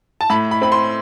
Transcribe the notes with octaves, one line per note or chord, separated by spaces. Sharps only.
A5
A2 B5
B5
C4 B5
C6